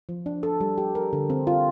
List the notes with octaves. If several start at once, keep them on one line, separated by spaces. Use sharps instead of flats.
F3
D4
A4
G3
G4
A#4
D3
C4
F4